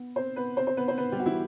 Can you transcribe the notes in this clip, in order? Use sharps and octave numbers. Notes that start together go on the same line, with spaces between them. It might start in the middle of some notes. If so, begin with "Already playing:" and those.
Already playing: B3
C4 C5
B3 B4
C4 C5
C4 C5
B3 B4
C4 C5
B3 B4
G3 G4
F#4
E3 E4